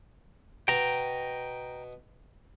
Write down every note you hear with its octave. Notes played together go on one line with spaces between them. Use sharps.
B2 G5 A#5